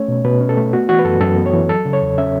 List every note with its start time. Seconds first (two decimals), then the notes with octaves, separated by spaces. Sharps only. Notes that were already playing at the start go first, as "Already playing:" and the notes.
Already playing: A3 C#4 C#5
0.08 B2
0.25 B2 B4
0.41 C#4
0.49 A4
0.57 A3
0.73 B3 F#4
0.89 E3 F#4
0.99 B4
1.05 F#2 A4
1.21 F#2 A4
1.37 B3
1.46 C#5
1.54 E3
1.69 F#3 A4
1.85 C#3
1.93 C#5
2.02 E2
2.18 C#4 E5